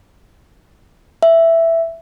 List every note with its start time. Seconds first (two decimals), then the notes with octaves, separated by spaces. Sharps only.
1.23 E5